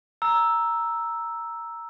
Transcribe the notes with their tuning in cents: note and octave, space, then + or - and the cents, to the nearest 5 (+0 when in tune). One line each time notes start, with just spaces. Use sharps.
A#5 +0 E6 +0